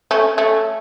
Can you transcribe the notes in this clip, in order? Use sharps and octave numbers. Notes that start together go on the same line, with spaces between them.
A3 C#4
A3 C#4